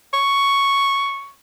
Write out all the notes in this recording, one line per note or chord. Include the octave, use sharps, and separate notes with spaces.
C#6